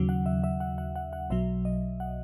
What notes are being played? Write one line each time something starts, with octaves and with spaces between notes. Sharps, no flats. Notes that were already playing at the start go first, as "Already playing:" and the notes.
Already playing: D#2 C#3 F#3
F#5
E5
E5
F#5
F#5
F#5
F#5
B1 B2 F#3 E5
D#5
F#5